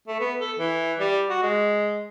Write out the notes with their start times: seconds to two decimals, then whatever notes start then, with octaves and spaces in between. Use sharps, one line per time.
0.08 A3
0.20 B3
0.41 A4
0.59 E3
0.99 G3
1.29 F#4
1.42 G#3